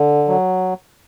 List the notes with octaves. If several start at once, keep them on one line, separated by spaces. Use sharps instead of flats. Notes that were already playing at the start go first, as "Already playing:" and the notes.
Already playing: D3
F#3